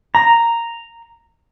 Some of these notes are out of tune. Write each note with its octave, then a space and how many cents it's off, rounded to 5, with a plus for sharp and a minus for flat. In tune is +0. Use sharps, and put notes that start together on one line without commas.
A#5 -5